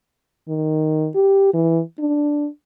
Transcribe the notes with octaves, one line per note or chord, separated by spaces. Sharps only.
D#3
G4
E3
D4